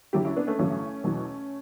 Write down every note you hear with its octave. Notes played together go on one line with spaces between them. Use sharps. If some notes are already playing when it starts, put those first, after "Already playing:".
D2 D3 F#3 E4 G4
C#4 E4
B3 D4
A3 C#4
A1 G2 D3 F#3 A3 C#4
E2 B2 F#3